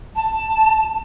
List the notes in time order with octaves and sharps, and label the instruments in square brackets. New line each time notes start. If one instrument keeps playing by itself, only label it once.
[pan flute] A5